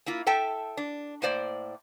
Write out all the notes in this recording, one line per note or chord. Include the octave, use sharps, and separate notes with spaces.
A#3 E4 F4
A4 E5 G5 A5
D4
A2 A#3 C5 D5